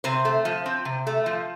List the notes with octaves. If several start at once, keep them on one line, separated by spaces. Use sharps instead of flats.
C3 C4 C5
A3
F3
C4
C3
A3
F3